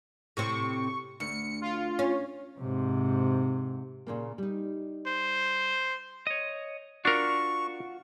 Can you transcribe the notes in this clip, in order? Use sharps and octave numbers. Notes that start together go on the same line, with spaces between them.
A2 C3 C4 C#6
D2 C#7
F4
C#4
G#2 C3
A#2 C#3 A#3
G3 D#4
C5
C#5 D#5
D4 F4 F#4 A#4 C#6